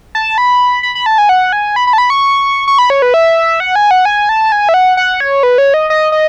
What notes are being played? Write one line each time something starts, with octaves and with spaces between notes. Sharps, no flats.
A5
B5
B5
B5
A5
G#5
F#5
G#5
B5
B5
A5
B5
C#6
C#6
B5
C#5
B4
E5
F#5
G#5
F#5
G#5
A5
G#5
E5
F#5
F#5
C#5
B4
C#5
D#5
D#5
D#5